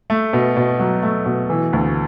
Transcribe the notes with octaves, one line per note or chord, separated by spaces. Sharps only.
A3
B2
B2
F#3
A3
B2
E3
D2